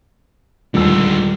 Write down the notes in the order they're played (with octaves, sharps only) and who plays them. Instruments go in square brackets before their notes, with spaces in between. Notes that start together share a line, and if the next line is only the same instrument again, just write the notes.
[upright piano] D#1 E6 [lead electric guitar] D3 G#3